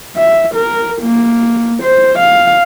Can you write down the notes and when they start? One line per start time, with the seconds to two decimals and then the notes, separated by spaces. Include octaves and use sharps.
0.17 E5
0.55 A#4
1.02 A#3
1.83 C5
2.19 F5